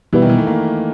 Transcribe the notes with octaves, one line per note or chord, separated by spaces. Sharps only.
B2 E3 G3 B3 E4
D#3
E3
A3
A#3